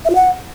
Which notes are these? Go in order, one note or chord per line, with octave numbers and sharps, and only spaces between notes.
E5
F4
F#5